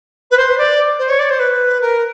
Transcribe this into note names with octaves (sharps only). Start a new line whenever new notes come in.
B4
C5
D5
C5
C#5
D5
C5
B4
A#4